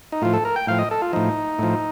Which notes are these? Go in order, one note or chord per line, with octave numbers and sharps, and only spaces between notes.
D#4
A2 F3 F4
A4
A#4
G5
A2 F3 F5
D#5
A4
F4
A2 F3 D#4
A2 F3